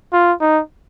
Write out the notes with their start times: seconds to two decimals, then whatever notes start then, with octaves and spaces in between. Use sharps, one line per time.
0.13 F4
0.41 D#4